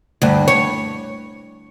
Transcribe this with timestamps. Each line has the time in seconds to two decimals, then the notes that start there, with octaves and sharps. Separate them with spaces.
0.22 D2 G2
0.48 C#5